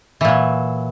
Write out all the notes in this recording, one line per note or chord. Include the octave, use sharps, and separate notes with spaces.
A#2 E3 F#3